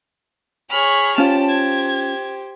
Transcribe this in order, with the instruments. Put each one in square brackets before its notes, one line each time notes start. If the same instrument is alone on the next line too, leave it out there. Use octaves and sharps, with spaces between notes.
[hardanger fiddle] G#4 C#5 [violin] B5 F6
[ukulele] C#4 F4 [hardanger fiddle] G4 C5 [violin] A5
[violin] G#6